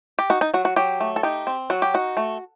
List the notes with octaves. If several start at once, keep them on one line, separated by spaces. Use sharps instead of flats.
G4
D#4 F#4
D#4
F#3 F#4
F#4
F#3 G4
A3
A4
D#4 G4
C4
F#3 F#4
G4
D#4 F#4
A3